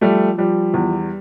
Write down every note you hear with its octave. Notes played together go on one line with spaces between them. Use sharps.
F3 G3 A3
F3 G3
E2